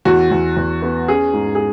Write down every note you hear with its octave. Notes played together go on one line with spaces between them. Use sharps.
E2 F#4
E2
E2
B3
C#4 G#4
G#2
G#4